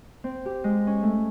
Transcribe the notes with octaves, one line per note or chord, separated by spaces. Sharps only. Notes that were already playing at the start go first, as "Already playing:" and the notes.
C4
G4
G#3
C#4
A3